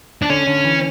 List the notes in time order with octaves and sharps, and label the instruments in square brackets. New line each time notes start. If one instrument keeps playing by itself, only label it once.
[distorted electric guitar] D4
[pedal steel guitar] D3 [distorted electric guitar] C#4
[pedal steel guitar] D3
E3